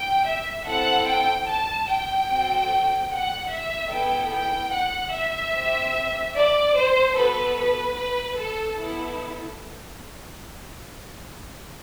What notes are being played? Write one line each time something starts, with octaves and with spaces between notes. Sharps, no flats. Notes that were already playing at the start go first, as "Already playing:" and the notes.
Already playing: G5
E5
C4 E4 A4 F#5
G5
A5
G5
C4 F#4 A4
F#5
E5
B3 E4 A4 G5
G5
F#5
E5
C4 G4
D5
C5
B3 F#4 A4 B4
B4
B4
A4
B3 E4 A4